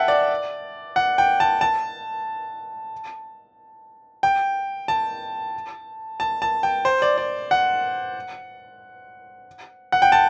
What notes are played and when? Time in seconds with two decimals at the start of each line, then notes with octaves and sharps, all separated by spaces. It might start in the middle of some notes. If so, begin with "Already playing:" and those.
Already playing: E5 F#5 G5 A5
0.08 D5
0.96 F#5
1.18 G5
1.40 A5
1.61 A5
4.23 G5
4.88 A5
6.20 A5
6.42 A5
6.63 G5
6.85 C5
7.02 D5
7.18 D5
7.51 F#5
9.92 F#5
10.02 G5
10.12 A5